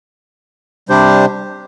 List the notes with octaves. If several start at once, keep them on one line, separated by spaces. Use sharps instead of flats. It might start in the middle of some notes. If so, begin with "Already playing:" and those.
C3 G3 D4 G4 C5